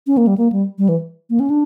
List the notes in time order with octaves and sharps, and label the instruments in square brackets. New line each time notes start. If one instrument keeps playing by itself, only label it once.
[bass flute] C#4
A#3
G3
A#3
G3
G3
E3
A#3
C#4
D4